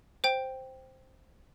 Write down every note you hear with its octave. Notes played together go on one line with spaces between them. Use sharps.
C5 G5